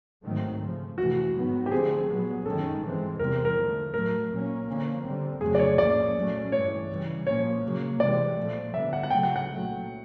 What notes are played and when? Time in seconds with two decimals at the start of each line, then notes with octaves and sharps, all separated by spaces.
0.23 G#2 D#3 F#3 A3 C4
0.60 C#3 F3 A3
0.98 F2 C3 E3 A3 F#4
1.35 G#2 D#3 F#3 B3
1.66 G4
1.72 D3 F3 A3 C4 G#4
2.09 A#2 F#3 B3
2.46 F#2 D#3 G#3 C#4 A4
2.82 G#2 E3 G#3 C4
3.19 E2 C3 E3 G3 C4 A#4
3.45 A#4
3.57 D3 F3 A3
3.93 A2 F#3 A3 A#4
4.31 A#2 F#3 A#3 C#4
4.67 D3 F3 A#3 C#4
5.04 D3 G3 C4
5.41 F2 C#3 F#3 A3 C4 G#4
5.55 D5
5.59 C#5
5.78 A2 F3 A#3 C#4 D5
6.15 A#2 F#3 A3 C#4
6.52 G2 E3 A3 C#5
6.90 C#3 E3 G3
7.26 A#2 F3 A#3 C#4 C#5
7.64 C#3 F#3 A#3
7.99 C3 E3 G#3 C4 D5
8.37 A#2 F3 A3
8.74 D3 G3 B3 E5
8.93 F#5
9.03 F#5
9.10 C#3 F#3 A3 G5
9.23 F#5
9.36 F#5
9.48 A#2 F#3 A3